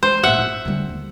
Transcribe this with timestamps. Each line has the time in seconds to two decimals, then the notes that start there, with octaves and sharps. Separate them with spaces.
0.03 G#3 C5
0.23 A#1 G#2 E5 F#5
0.38 F4
0.65 D3 G3
0.89 D#2